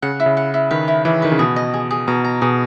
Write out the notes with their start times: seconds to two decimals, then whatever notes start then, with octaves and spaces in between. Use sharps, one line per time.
0.02 C#3 F#5
0.20 E4
0.26 C#3
0.37 F#5
0.54 E4
0.71 D#3 B4
0.88 E4
1.05 E3 E4
1.22 D#3 B4
1.32 C#3
1.39 B2 G#4
1.56 D#5
1.74 G#4
1.91 G#4
2.08 B2 A#5
2.25 A#5
2.42 B2 G#4